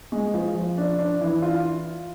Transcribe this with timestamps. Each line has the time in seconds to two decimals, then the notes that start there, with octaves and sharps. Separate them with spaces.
0.12 G#3
0.34 F3
0.55 F3
0.78 D4
0.98 D4
1.21 E3
1.42 F4